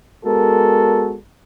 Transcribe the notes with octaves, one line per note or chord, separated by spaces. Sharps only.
G#3 B3 F#4 A4 A#4